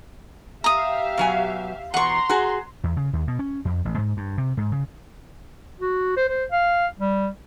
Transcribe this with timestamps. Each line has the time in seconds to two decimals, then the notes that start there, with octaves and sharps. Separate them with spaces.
0.64 G4 E5 F5 A#5 D#6
1.17 B2 F#3 G#5
1.94 E2 B2 F#5 A#5 C6 C#6
2.29 F#4 G#4
2.84 E2
2.97 C#3
3.13 D#2
3.28 B2
3.39 C#4
3.65 F2
3.85 A1
3.98 G#2
4.17 G2
4.38 C3
4.57 G#2
4.72 C#3
5.80 F#4
6.17 C5
6.29 C5
6.52 F5
6.99 G3